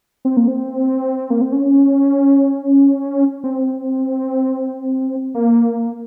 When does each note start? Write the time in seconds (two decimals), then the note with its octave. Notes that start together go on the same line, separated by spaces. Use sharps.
0.25 C4
0.37 A#3
0.48 C4
1.30 A#3
1.41 C4
1.52 C#4
3.44 C4
5.35 A#3